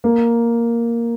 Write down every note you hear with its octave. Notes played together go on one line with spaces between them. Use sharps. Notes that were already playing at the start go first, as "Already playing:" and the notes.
A#3